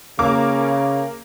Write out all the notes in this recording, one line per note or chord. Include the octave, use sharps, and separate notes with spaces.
C#3 A#3 A#4 D6